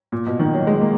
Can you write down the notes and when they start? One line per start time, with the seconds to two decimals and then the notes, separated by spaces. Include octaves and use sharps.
0.12 A#2
0.26 B2
0.39 D#3
0.54 F#3
0.67 G#3
0.81 A#3